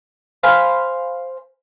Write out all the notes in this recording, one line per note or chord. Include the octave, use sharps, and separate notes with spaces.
C5 F5 G#5 B5